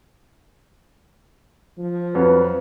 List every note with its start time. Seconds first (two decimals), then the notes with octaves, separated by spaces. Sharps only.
1.77 F3
2.15 F2 F#3 B4